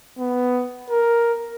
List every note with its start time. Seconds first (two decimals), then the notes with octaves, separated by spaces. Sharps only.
0.19 B3
0.90 A#4